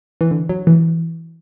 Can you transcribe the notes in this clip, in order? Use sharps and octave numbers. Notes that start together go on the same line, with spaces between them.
E3
D3
F#3
E3